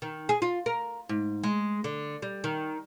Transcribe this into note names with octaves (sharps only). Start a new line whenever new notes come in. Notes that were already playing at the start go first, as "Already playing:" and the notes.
D#3
G#4
F4
A#4
G#2
G#3
D3
G3
D#3